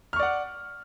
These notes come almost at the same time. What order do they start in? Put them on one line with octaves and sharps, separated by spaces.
F6 C#6 D5 F#5